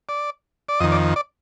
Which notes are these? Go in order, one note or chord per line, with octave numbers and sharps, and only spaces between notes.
D5
D5
F2 D#3 D#5
D5
D5